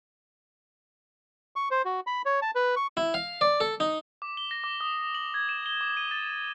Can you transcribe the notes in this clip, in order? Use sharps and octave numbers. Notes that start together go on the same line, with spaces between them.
C#6
C5
F#4
B5
C#5
A5
B4
C#6
E4
F5
D5
A4
D#4
D6
G7
A#6
D6
D#6
F#7
G#6
E7
G7
D6
D#7
A6